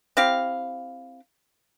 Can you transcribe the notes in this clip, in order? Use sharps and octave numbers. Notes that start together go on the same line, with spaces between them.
C4 E4 G4 F5